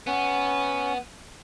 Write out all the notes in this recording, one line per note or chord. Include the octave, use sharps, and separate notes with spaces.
B3 C#4